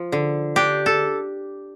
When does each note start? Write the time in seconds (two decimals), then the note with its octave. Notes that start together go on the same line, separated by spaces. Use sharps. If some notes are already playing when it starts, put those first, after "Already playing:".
Already playing: F3
0.12 D3
0.56 D4 G4
0.86 A4